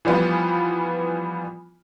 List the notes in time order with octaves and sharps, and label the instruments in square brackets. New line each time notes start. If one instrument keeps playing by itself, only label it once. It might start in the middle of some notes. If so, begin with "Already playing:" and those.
[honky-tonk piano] E3 F3 G3 B3 F4